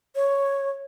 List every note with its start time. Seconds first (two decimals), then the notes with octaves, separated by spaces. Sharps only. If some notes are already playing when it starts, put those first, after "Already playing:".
0.16 C#5